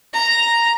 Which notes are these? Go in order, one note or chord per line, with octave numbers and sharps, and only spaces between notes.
A#5